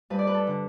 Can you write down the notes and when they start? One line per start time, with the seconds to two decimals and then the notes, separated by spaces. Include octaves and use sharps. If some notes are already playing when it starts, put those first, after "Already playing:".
0.10 G2 B4
0.19 D5
0.27 B4
0.34 A4
0.47 D3